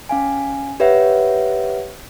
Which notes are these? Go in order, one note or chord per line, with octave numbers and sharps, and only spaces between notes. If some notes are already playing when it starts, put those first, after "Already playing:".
C#4 F5 G#5
G4 B4 C#5 E5 F#5